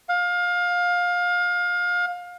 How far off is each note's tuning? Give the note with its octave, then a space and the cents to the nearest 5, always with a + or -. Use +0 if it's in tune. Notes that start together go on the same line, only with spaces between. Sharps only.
F5 +25